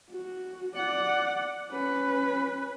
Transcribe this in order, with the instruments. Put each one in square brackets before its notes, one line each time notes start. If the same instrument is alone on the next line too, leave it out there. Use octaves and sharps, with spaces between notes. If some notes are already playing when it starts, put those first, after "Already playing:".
[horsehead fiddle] F#4
D5 F#5
C#4 B4